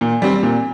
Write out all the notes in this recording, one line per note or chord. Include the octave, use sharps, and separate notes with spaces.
A#2
G3 C4
A#2